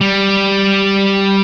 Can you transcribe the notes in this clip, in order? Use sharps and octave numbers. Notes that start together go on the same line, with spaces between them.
G3